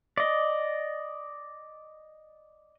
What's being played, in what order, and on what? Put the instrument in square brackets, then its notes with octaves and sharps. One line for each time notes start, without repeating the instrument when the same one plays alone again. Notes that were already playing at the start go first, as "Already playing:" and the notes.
[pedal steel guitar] D5 D#5